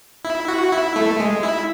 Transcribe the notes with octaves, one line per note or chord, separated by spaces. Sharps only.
E4
F#4
E4
A3
G#3
E4